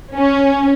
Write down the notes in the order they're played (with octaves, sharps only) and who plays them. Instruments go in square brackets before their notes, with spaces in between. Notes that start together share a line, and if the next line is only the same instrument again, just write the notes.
[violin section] C#4